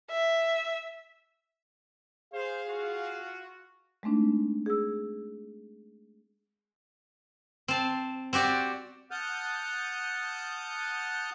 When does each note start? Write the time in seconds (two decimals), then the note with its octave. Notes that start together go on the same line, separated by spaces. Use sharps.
0.10 E5
2.34 G#4 C5 F5
2.67 F4 F#4
4.03 G#3 A3 C4 D4 D#4
4.66 G#4 E6
7.68 C4 A5
8.33 C4 F#4 G4 D5
9.11 F#5 A5 D#6 F6 G6